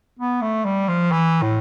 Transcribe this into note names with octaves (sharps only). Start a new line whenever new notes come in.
B3
A3
G3
F3
E3
A2